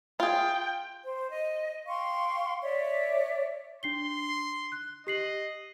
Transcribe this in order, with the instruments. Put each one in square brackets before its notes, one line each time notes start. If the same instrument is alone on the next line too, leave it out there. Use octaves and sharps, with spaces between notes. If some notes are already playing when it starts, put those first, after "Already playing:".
[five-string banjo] F4 G#4 [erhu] G5
[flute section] C5
D#5
F5 G5 C6 C#6
C#5 D5 E5
[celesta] D4 C7 G7 [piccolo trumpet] C6
[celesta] F#6
[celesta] G4 C7 F#7 [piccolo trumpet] D#5